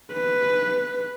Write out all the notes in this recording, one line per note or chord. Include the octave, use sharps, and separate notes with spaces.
B4